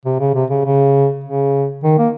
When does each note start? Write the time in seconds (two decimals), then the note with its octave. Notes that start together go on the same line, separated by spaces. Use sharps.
0.06 C3
0.20 C#3
0.35 C3
0.50 C#3
0.65 C#3
1.24 C#3
1.84 D#3
1.98 A#3